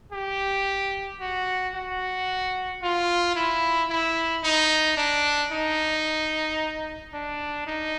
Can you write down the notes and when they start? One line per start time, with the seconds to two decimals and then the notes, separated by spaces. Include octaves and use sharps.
0.13 G4
1.20 F#4
1.74 F#4
2.82 F4
3.36 E4
3.90 E4
4.44 D#4
4.97 D4
5.51 D#4
7.14 D4
7.67 D#4